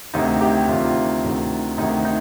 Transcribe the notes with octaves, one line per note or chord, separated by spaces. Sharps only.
D2 C3 D#3 D#4
G4
D2 C3 D#3 F4
D2 C3 D#3
D2 C3 D#3 D#4
D#4